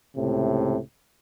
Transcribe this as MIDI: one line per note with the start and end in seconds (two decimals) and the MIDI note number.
0.16 0.78 37
0.16 0.78 45
0.16 0.78 48